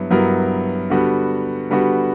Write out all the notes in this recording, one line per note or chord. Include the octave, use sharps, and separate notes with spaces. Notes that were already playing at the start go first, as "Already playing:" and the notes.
Already playing: G2 F#3 B3 E4
G2 F#3 B3 E4 A#4
D3 G3 B3 F#4
D3 G3 B3 F#4